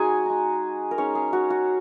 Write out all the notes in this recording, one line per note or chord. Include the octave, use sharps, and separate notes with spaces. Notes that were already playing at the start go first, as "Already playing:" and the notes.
Already playing: G#3 D#4 F#4 G#4 F#5 G#5
G#3 D#4
A#4
G#3 C#4 D#4 C#5
G#4
F#4
F#4